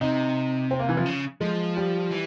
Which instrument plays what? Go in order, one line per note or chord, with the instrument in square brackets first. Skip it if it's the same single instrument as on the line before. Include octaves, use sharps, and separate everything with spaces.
[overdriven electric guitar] C3 [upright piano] D#4
[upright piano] C4
A#3
E3
F3
[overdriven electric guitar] C#3
[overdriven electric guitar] F3 [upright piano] G#3
[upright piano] G3
[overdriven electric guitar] E3